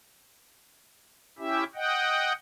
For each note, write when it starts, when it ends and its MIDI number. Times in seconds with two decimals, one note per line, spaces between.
1.38 1.64 61
1.38 1.64 64
1.38 1.64 67
1.38 1.64 76
1.75 2.33 75
1.75 2.33 78
1.75 2.33 79